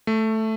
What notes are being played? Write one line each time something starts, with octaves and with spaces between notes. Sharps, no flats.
A3